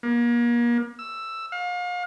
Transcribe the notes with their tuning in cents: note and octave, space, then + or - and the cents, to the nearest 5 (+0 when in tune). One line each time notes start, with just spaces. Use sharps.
A#3 +35
E6 +5
F5 +35